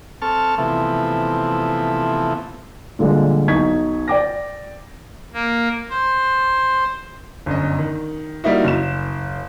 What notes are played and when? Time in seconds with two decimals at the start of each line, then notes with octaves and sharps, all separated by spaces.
0.22 C4 A4 A5 C#6 F6
0.58 C3 E3 F3 A3 B3
2.99 A#2 D3 F3 G3 G#3
3.48 B1 D#4 C#6 G#6 B6
4.08 D5 G5 D6 A#6
5.33 A#3
5.90 C5
7.46 G1 F#2 D#5
7.79 D#3
8.44 G3 A#3 D#4 E4 F#4
8.64 F#1 E7